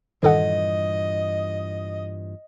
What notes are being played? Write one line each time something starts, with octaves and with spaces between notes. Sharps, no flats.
G2 A#2 D#3 E3 A4 D#5 F#5